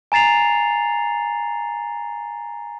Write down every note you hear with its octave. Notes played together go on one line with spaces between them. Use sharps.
G#5 A#5 A6 C7 F7